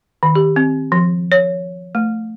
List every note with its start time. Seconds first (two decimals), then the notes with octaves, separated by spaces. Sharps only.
0.23 D#3
0.35 G4
0.56 C4
0.92 F3
1.32 C#5
1.95 A3